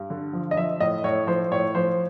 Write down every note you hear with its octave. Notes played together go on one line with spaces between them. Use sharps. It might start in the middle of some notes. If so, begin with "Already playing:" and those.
Already playing: G2
D3
F3
D#5
F3 E5
A2 D#5
A2 C#5
F3 C5
A2 C#5
F3 C5